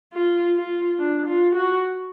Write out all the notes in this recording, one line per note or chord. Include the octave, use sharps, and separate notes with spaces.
F4
F4
D4
F4
F#4